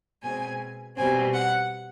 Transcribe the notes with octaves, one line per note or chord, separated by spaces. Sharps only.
B2 G#3 C4 G#5
B2 G3 C4 G#5
F#5